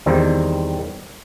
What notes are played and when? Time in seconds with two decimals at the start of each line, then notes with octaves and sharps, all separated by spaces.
0.06 E2 D#3 G3 C4